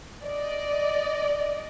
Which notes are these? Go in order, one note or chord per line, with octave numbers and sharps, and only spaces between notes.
D5 D#5